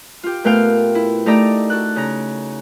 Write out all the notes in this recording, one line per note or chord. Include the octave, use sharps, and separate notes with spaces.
F4 G4
A#2 A3 B3 F5 G5 F6
E4
A3 D#4 G4 D5 A#5 E6
F#4 A4 F#6
C#3 A#5